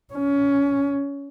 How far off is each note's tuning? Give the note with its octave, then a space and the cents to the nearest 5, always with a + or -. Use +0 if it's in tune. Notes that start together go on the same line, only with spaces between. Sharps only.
C#4 +20